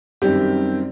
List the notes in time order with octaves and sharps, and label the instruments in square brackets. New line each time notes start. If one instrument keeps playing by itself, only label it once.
[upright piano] F#2 D#3 G3 C4 G4